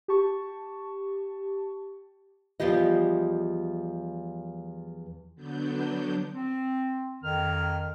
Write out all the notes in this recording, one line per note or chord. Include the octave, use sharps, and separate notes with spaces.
G4 A5 C#6
E2 F3 G3 G4 D#5
D3 F#3 B3 D4 G6
C4
F2 D#3 F6